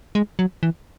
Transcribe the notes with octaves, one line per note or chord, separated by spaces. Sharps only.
G#3
F#3
E3